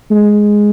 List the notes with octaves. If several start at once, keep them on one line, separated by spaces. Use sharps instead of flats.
G#3